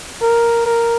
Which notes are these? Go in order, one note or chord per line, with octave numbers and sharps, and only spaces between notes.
A#4
A#4